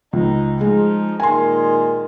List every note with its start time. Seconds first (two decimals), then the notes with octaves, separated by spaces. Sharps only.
0.13 C#2 D#4
0.61 F3 G#3 D#4
1.20 A#2 D#3 G#3 G#5 C6